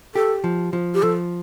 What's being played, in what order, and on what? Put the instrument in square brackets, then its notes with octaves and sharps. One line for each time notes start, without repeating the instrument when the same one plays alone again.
[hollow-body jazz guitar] G4 [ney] A4
[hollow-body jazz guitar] F3
F3
[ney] G4
[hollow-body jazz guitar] F3 [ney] A4